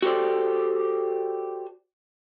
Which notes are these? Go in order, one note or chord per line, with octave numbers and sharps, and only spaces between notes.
F#4 G4 A4 C5 D5